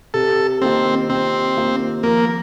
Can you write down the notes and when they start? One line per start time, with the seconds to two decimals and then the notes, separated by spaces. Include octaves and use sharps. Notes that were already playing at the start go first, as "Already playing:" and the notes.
0.14 C3 A4
0.62 D#3 A#3 C4 F4
1.09 C3 C4
1.57 D#3 A#3 F4
2.03 F3 A#3